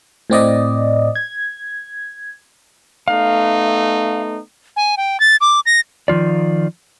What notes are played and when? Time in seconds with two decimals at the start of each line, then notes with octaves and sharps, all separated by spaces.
0.30 A2 C4 D5 D#5
1.15 G#6
3.08 A3 B3 D#4 F5
4.77 G#5
4.97 G5
5.20 A6
5.41 D6
5.66 A#6
6.08 D#3 F3 F4 D5